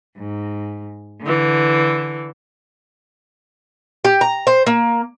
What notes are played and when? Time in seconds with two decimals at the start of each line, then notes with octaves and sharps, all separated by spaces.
0.18 G#2
1.23 D3 E3
4.05 G4
4.21 A#5
4.47 C5
4.66 A#3